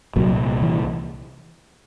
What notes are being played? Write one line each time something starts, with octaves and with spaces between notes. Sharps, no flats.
C2 A#2 F#3
E3